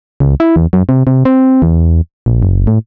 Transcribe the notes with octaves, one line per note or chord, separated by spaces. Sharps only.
C#2
E4
E2
F#2
C3
C3
C4
E2
A#1
F#1
A2